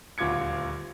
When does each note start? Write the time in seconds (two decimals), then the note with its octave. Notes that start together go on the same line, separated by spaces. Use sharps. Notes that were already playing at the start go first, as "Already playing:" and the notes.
0.18 D#1 D2 F4 D6 G#6 C#7